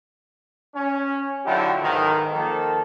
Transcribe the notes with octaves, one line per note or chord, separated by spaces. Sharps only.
C#4
D3 F#3 E4 F4 G4
B1 G#2 D#3
D#3 F3 A#3 A4